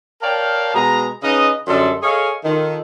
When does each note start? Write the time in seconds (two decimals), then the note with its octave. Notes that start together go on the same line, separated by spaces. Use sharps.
0.22 A#4 C#5 D5 F5 G5 A5
0.74 B2 G#3 G#4 A#5
1.23 C#3 D#4 B4 D#5
1.67 F#2 D3 G3 A4 D#5 C6
2.03 G#4 A4 C#5 D#5 F5
2.44 D#3 F4 A4